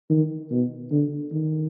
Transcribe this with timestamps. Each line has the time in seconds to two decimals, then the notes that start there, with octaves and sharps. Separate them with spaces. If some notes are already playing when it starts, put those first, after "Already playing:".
0.10 D#3
0.51 B2
0.91 D3
1.32 D#3